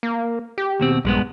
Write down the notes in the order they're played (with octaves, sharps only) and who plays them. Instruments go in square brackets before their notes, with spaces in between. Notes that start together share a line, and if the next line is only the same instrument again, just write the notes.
[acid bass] A#3
G4
[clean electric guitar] D#2 B2 C4
[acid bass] A#1 [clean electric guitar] G2 G#3 B3